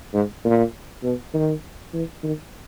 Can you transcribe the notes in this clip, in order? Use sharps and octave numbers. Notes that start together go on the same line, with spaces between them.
G#2
A#2
B2
D#3
E3
D#3